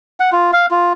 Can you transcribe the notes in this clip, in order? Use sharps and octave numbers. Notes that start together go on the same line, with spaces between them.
F#5
F4
F5
F4